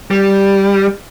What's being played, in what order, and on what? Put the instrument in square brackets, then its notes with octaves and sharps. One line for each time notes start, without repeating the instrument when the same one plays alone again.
[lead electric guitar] G3